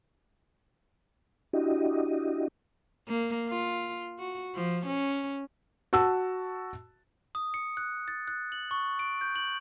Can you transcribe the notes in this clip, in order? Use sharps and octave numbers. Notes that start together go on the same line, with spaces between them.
D4 E4 F#4 G4 D#5
A#3
F4
F#4
F3
C#4
F#4 A5 E6
D#6
C#7
F#6
A6
F#6
F#7
C#6
D7
G6
F#7